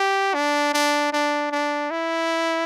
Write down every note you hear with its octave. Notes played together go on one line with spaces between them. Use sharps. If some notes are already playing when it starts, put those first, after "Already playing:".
Already playing: G4
D4
D4
D4
D4
E4